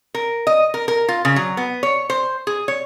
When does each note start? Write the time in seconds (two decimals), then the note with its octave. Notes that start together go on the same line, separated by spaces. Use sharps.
0.14 A#4
0.47 D#5
0.74 A#4
0.88 A#4
1.08 F4
1.25 C#3
1.36 F#3
1.57 B3
1.83 C#5
2.10 C5
2.47 G#4
2.68 C#5